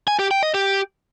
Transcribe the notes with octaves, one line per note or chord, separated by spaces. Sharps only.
G#5
G4
G5
D#5
G4